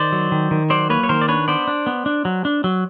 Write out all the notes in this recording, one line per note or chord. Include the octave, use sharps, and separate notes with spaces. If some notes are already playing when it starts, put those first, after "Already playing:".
Already playing: D#3 C5 D5
F#3
D#3
D#3
F#3 C5 D5
A#3 B4 C#5
C#5
D#3 A#4 C5
D5
D4 B4 C#5
B3 C5 D5
D4
B3
D4
F#3
D4
F#3